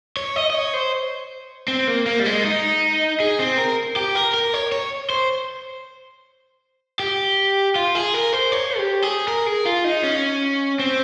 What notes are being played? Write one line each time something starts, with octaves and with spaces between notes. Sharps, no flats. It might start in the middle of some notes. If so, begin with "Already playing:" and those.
C#5
D#5
D#5
C#5
C5
C4
A#3
A#3
G3
G#3
D#4
G#4
C4
A#4
G4
A#4
A#4
C#5
C#5
C5
G4
F4
G#4
A#4
C5
C#5
G4
G#4
A#4
G#4
F4
D#4
C#4
C4